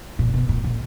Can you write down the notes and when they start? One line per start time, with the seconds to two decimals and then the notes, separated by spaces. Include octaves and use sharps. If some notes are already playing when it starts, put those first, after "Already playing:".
0.19 A#2
0.34 B2
0.49 A2
0.64 A#2